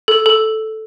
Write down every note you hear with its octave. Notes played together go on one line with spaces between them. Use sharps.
A4
A4